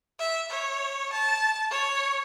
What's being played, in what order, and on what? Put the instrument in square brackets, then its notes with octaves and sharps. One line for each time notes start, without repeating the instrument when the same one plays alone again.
[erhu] E5
C#5
A5
C#5